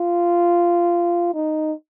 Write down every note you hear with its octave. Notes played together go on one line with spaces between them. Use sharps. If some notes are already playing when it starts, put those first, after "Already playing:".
Already playing: F4
D#4